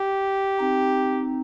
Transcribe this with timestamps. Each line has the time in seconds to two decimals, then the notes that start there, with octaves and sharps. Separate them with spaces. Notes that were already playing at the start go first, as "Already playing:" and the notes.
Already playing: G4
0.59 C4 D#4